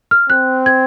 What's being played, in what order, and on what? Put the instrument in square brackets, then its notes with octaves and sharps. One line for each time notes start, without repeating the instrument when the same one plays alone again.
[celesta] F6
[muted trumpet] C4 [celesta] F#6
[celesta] G#6